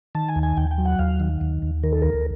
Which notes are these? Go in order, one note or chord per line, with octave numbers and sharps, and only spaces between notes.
D#3 A5
G#5
D#2
G#5
D#2 G5
G5
F#3
F#5
D#2 F5
D#3
D#2
D#2
D#3 A#4
A4
D2 A#4